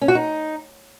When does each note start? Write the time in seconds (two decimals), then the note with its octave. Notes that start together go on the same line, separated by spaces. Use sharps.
0.01 C#4
0.08 F#4
0.15 D#4